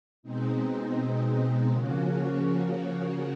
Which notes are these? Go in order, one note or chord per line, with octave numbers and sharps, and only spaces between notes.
B2 G#3 C4 D#4
C#3 F3 A#3 C#4 F#4